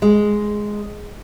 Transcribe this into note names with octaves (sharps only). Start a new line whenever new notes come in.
G#3